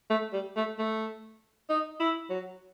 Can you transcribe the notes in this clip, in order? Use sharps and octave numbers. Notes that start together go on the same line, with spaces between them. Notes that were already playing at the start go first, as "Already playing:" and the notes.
A3
G3
A3
A3
D#4
E4
F#3